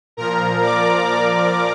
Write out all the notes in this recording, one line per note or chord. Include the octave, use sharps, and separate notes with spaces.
A#2 F3 A#4 A#5
D5 D6
D5 D6